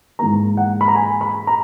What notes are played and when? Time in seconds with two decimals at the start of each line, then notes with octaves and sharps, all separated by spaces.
0.19 G#2 E3 A#3 A#5
0.57 F#5
0.81 B5
0.88 A#5
0.95 G#5
1.21 B5
1.47 A#5